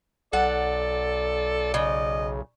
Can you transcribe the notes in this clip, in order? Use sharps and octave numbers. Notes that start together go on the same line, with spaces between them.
B1 A4 D5 F#5
C#3 D#5